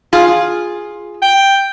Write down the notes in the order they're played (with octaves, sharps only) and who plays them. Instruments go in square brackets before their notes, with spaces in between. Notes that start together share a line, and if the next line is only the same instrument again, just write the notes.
[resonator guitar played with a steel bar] F4 G#4
[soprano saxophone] G5